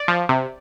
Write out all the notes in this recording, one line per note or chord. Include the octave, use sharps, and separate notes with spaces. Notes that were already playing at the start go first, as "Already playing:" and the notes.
Already playing: D5
F3
C3